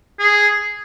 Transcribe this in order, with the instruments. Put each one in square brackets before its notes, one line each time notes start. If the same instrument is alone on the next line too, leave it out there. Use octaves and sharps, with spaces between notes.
[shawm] G#4